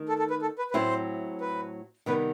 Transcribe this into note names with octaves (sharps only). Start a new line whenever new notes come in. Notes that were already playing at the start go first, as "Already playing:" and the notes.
Already playing: D#3 A3
A4
A4
B4
A4
B4
B4
A2 F#3 A3 C4 E4 C5
B4
C3 D#3 G3 B3 B4